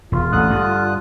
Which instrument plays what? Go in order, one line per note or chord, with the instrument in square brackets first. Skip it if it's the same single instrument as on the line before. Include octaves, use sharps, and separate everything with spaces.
[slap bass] E1 [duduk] F4
[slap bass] A1 [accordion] D3 D#6 F#6
[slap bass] G2